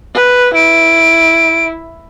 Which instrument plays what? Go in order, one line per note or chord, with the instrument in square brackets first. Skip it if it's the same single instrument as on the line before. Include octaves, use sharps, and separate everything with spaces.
[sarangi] B4
[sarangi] E4 [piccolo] D7